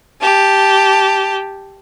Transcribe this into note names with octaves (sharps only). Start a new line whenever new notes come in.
G4 A5